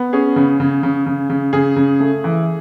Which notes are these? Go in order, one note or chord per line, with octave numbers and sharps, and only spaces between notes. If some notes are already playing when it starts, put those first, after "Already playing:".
Already playing: B3
C#4 G#4
C#3
C#3
C#3
C#3
C#3
C#3 G#4
C#3
A3
E3